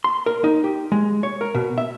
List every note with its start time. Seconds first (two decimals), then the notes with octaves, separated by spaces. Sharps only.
0.04 C6
0.26 A#4
0.44 D#4
0.64 G4
0.92 G#3
1.23 C#5
1.41 A#4
1.55 B2
1.78 E5